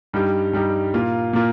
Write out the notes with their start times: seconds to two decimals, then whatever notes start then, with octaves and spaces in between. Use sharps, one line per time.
0.13 G2 G3 D#4 G4
0.53 G2 G3 D#4 G4
0.94 A#2 A#3 F4
1.33 A#2 A#3 F4